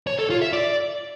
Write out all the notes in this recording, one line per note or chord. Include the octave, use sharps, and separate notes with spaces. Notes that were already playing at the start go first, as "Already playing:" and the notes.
C#5
A4
F4
E5
D5